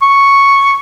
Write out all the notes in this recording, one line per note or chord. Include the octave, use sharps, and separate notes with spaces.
C#6